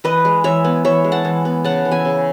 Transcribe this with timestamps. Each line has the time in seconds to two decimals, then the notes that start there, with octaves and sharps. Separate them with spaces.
0.04 E3 B4 D#5
0.25 G#3
0.44 E3 C#5 E5
0.64 B3
0.85 E3 C#5 E5
1.04 G#3
1.12 F#5 A5
1.25 E3
1.45 B3
1.64 C#3 F#5 A5
1.85 E3
1.91 E5 G#5
2.05 C#3